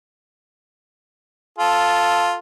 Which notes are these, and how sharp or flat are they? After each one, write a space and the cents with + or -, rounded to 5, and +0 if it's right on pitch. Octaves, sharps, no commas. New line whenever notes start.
F4 +0 A4 +0